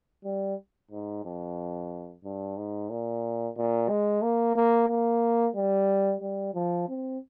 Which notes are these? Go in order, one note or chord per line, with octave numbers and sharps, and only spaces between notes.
G3
G#2
F2
G2
G#2
A#2
A#2
G#3
A#3
A#3
A#3
G3
G3
F3
C4